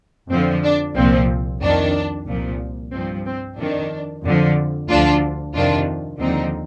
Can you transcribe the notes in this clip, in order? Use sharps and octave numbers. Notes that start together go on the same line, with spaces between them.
F2 D3 F3 C4
D4
C2 A#2 F3 C4
F2 D#3 D4
C2 A#2 F3
G2 F3 C4
C4
F2 D#3 D4
F2 D3 F3
D2 D3 F3 D4 F4
F2 C3 D#3 D4 F4
D#2 D3 F3 C4 D#4